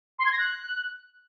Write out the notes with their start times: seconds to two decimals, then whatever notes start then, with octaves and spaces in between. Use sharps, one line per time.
0.19 C6
0.25 G#6
0.32 A#6
0.39 F#6